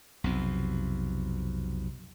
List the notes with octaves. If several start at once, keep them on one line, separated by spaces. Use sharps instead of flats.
B1 F2 C3